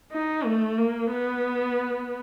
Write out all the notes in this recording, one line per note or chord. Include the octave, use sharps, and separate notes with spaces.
D#4
A3
A#3
B3